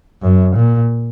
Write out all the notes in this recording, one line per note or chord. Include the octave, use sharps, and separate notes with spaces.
F#2
A#2